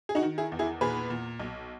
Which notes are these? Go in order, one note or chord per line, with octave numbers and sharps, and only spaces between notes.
G#4
D#4 F#4
D#3
E4 G#4
E2
E4 G#4
A#2 G#4 B4
A#2
B1